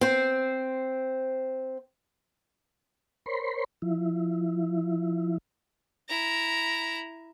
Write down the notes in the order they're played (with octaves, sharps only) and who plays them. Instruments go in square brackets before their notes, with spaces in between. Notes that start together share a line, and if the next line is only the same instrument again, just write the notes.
[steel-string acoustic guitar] C4 C5
[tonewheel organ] A#4 C5 C#5 B5 C6
F3 E4
[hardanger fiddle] E4 A#5